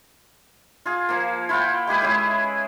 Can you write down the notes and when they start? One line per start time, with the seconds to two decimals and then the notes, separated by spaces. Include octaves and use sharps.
0.86 F4 G#4
1.09 F3 A#3
1.49 E4 F4 F#5 G5
1.87 G#3 G4 G#4 B4
2.01 G#3 C#4 E4 G#4